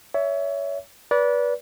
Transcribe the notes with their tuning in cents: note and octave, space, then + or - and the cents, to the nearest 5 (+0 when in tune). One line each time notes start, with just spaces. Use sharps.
C#5 +25 E5 +0
B4 -25 D5 -25